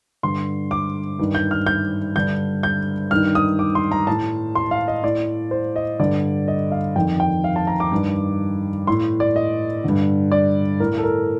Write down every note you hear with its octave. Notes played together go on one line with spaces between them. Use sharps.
G2 D3 C6
D6
G2 D#3
G6
F6
G6
G2 D3 G6
G6
G2 D#3 F6
D#6
D6
C6
A#5
A2 A5
C6
F5
D#5
A2 D5
C5
D#5
G2 D3 D5
D#5
F5
F2 D#3 G5
G5
F5
A5
A#5
D6
G2 D#3
A2 C6
D5
D#5
G2 D3
D5
A2 A#4
A4
A#4